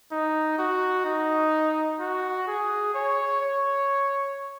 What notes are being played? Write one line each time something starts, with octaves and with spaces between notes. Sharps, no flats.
D#4
F#4
D#4
F#4
G#4
C#5
C#5